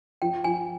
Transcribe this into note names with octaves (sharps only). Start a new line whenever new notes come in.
F3 G5
F3 G#5